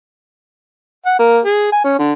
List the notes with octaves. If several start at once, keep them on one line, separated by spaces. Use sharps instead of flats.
F#5
A#3
G#4
G#5
C#4
D3